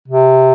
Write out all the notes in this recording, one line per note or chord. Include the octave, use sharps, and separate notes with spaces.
C3